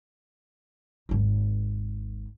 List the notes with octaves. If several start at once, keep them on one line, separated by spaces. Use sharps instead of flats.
G#1 D#2